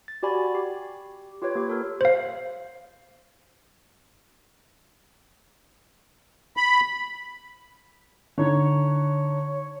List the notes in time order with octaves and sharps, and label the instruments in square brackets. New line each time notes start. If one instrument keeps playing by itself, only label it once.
[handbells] A6
F#4 G4 D5 G#5 B5
G4
F4 G4 B4 C#5 G#6
A#3 G4
A4 A#4
C5 F5
[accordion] B5
[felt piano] D3 D#4 [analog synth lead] C#5